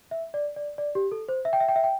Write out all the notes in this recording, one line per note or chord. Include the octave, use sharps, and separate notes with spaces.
E5
D5
D5
D5
G4
A4
C5
E5
G5
E5
G5
E5
G5